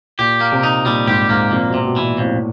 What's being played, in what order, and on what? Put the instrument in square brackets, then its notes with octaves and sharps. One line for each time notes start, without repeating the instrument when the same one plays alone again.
[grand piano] A#2 [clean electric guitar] G4
[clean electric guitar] A#3
[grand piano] C3
[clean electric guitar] D#4
[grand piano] A#2 [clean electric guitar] G3
[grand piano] G#2 [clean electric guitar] G4
[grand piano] G#2 [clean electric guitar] A#3
[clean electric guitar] F2 [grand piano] A#2
[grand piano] B2
[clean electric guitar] C3
[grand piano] B2
[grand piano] A#2 [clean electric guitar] E3
[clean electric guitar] F2 [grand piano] A2